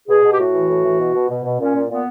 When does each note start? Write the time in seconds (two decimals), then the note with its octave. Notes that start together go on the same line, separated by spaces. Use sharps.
0.08 B2 G#4
0.23 B2
0.32 G4
0.38 A2 F#4
0.53 E3
0.68 A2
0.84 E3
0.99 B2
1.13 B2
1.29 B2
1.44 B2
1.60 A#2 C#4
1.74 A#2
1.90 A#2 B3